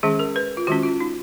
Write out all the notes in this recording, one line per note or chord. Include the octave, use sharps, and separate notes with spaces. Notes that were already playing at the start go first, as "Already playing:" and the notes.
D#3 G#3 C#4 G#4
A#4
B4
F4
D#3 G#3 C#4 F#4
F4
D#4